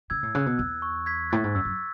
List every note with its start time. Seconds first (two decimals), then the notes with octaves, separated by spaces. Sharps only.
0.10 C#3 E6 G#6
0.23 A2
0.35 C#3 F#6
0.46 B2
0.58 E2 E6
0.82 C#6
1.06 G#6 B6
1.30 A2 F#6 A6
1.44 G#2
1.55 F#2 E6
1.65 F#2